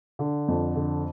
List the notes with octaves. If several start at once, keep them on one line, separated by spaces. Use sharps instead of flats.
D3
F2
D3